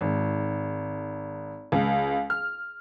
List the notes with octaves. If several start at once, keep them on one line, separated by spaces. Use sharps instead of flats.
G#1
C#2
F6